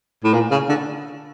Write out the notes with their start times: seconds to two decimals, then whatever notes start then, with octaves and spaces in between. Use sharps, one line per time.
0.24 A2
0.33 A#2
0.51 C#3
0.69 D3